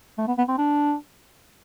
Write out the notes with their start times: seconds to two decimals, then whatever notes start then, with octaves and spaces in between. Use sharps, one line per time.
0.18 A3
0.28 B3
0.38 B3
0.49 C4
0.58 D4